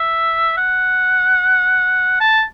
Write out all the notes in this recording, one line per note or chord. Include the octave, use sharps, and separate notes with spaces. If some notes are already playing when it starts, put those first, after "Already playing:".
Already playing: E5
F#5
A5